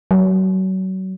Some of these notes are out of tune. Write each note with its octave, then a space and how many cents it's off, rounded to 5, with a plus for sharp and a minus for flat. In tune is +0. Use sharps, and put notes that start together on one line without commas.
F#3 +30